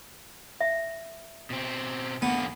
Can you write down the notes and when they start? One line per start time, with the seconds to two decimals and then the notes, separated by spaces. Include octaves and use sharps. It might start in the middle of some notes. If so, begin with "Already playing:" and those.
0.61 E5
1.50 B2 C4
2.22 E2 D3 A#3 B3